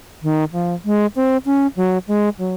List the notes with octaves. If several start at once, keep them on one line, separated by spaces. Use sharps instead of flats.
D#3
F3
G#3
C4
C#4
F#3
G#3
F#3